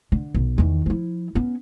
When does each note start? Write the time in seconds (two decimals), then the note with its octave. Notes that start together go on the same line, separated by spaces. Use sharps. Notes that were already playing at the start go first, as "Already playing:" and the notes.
0.12 D3
0.34 B1
0.58 E2 D#3
0.86 F3 E4
1.35 B3 C#4